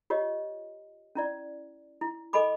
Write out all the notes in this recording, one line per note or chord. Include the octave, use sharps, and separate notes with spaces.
F4 G4 C#5 D#5
C#4 E4 D5
E4
A4 D#5 G#5 B5 D6